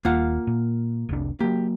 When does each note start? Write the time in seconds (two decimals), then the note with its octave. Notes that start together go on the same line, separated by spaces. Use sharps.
0.05 D#1 A#3 F4 F#5
0.47 A#2
1.09 F1 C2 D4
1.40 F#3 A#3 G4